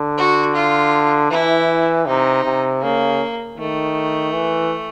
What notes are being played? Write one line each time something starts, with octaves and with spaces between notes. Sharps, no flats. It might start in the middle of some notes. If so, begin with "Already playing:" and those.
Already playing: D3
F#4
F4
E3 E4
C3 D#4
C3
C#3 A#3
D#3 A3
E3